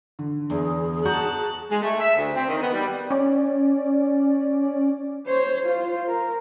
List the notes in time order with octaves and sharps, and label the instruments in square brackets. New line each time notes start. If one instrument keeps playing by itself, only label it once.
[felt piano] D3
[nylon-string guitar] E2 [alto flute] G#4
[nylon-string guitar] F#4 [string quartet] A5 F#6 [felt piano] A#5 C#6 G6
[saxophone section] G#3
A3
E5
D2
C4
D#3
B3
G3
[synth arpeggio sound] C#4 D5
[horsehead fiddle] C5 C#5
F4 C5
A#4